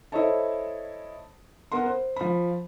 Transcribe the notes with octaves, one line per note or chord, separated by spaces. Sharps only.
E4 A4 C5 C#5 D#5 A5
B3 A#4 F#5 C6
C5
F3 B5